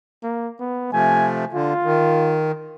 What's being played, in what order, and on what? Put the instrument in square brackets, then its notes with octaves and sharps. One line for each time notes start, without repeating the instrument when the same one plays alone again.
[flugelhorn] A#3
B3
[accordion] C3 F3 A3 [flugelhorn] G#5
[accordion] D3 [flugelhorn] F4
[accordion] D#3